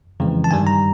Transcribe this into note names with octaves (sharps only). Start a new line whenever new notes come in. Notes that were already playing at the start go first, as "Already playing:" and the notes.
F2 C#3 E3 G#3
A5
G2 D#3 G3 G#5
A#5